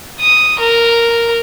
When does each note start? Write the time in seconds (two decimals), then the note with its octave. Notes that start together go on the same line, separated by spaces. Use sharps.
0.20 D#6
0.60 A#4